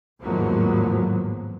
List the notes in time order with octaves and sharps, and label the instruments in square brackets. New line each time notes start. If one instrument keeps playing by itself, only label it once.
[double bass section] G#1 E2 A2 F3 F#3 A#3